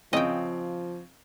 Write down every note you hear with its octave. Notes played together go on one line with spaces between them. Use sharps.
C#3 F3 C4 D#5 G5